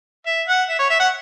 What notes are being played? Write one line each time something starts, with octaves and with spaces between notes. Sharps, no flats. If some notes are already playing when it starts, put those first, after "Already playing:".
E5
F#5
E5
C#5
E5
F#5